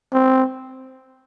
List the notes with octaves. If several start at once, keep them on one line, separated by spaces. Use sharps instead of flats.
C4